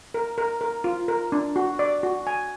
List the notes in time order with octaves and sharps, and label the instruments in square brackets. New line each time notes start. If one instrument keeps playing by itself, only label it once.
[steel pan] A#4
A#4
A#4
F4
A#4
D4
F#4
D5
F#4
G#5